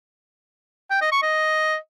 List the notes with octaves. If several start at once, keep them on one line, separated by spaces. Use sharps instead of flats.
G5
D#5
C#6
D#5